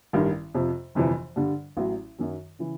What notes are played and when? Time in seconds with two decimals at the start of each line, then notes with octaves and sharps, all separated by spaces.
0.13 A1 G2 D#3 G3
0.54 F2 C3 F3
0.95 G1 F2 C3 E3
1.36 G2 D3 G3
1.77 A1 A2 F#3
2.19 F#2 D#3 F#3
2.59 C#3 E3